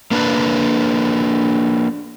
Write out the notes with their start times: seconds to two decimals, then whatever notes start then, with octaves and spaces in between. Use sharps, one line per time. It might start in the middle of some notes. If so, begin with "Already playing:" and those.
0.11 A#3 D4 B4